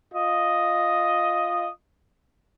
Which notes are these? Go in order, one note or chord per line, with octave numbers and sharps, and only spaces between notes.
F4 D#5